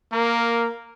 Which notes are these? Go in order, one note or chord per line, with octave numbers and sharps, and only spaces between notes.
A#3 A#4